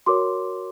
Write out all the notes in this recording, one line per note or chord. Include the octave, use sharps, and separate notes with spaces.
F#4 A#4 C#5 C6 D6